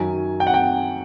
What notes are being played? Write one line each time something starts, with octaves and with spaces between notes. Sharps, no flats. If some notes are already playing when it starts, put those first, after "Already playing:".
Already playing: F#2 D#3 F#3 G#5
G5
F#5
G5